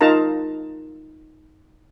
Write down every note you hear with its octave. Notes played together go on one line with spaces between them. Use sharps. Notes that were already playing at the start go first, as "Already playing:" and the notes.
D#4 F4 A#4 A5 A#5